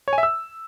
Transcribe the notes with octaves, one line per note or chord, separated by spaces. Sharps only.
C#5
G#5
E5
E6